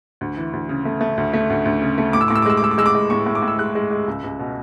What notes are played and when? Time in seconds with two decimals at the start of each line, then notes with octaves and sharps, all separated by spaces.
0.21 D2
0.37 E3
0.53 D2
0.69 C#3
0.85 A3
1.01 A3
1.17 D2
1.33 A3
1.50 D2
1.65 D2
1.82 C#3
1.98 A3
2.13 A2 D6
2.21 E6
2.28 A2 D6
2.36 E6
2.42 D6
2.46 G#3 E6
2.57 D6
2.62 G#3 E6
2.71 D6
2.78 G#3 E6
2.86 D6
2.95 G#3
3.10 A2 C#6
3.26 A2
3.35 D6
3.42 A2
3.48 E6
3.59 G#3 F#6
3.75 G#3
3.91 G#3
4.07 C#2
4.24 C#2
4.39 B2